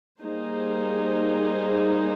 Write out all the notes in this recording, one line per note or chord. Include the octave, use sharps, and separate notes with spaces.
G3 A#3 D#4 G#4 C5